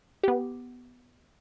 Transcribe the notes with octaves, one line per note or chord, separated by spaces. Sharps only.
B3 G4